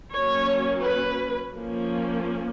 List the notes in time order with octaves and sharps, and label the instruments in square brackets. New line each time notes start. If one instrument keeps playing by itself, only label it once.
[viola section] F#3 A#3 C#4 C#5
B4
F3 A#3 C#4